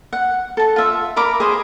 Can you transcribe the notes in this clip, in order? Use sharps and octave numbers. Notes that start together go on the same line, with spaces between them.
F#5
A4 A5
F4 E5
A#4 A#5 B5 D6
G#4 C5 D#5